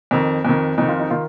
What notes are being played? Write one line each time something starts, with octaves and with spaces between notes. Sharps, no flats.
F2 D#3
F2 D#3
F2 D#3 D#4
F4
D#4
D#3 F4